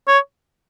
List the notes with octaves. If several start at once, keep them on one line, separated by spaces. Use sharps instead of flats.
C#5